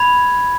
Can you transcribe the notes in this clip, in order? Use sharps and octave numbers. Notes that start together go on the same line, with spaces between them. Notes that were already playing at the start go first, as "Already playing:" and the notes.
Already playing: B5 G#6